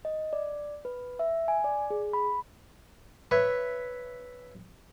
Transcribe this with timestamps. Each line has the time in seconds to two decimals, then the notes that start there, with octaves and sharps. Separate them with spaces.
0.05 D#5
0.33 D5
0.85 B4
1.19 E5
1.48 G#5
1.64 D5
1.90 G#4
2.13 B5
3.31 B4 C#5 E5